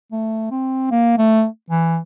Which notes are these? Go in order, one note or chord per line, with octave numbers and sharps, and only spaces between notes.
A3
C4
A#3
A3
E3